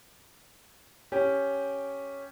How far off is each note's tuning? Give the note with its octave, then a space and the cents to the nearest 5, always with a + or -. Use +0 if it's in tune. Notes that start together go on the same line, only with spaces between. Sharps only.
C#4 +0 G4 +0